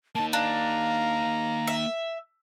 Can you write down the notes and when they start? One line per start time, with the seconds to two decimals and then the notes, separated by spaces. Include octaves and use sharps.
0.15 A#3 D#4 A5
0.33 D4 F5 A#5
1.67 E5